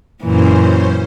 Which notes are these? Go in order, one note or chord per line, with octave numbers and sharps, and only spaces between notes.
F#2 A#2 E3 C#4 C5